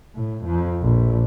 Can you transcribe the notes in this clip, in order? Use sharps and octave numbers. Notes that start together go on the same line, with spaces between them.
A2
F2
A#1